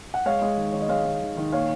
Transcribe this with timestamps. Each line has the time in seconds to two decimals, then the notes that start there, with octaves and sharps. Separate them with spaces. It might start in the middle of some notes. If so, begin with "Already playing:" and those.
0.14 F#5
0.26 G#3 C#5 F5
0.42 G#3
0.57 D#3
0.72 D#3 C#5
0.81 D#5
0.89 G#3 C#5 F5
1.05 G#3
1.21 D#3
1.37 D#3
1.52 A#2 C#5 F5